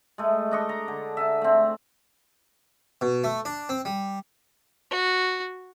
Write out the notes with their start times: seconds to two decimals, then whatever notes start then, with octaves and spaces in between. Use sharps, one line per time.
0.18 G#3 A3
0.51 D4 D#5 C#6
0.69 A#5
0.88 D3
1.17 E5 G#5 A5
1.42 A3 C4
3.01 B2
3.24 A3
3.45 D4
3.69 C4
3.85 G3
4.91 F#4